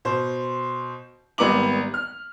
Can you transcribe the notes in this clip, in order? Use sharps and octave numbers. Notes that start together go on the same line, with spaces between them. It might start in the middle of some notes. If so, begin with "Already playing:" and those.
B2 C5
G#1 G3 B3 A#5 D6 F#7
F6